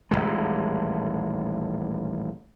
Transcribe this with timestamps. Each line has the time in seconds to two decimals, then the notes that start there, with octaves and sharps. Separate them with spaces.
0.11 D#1 A1 E2 G#3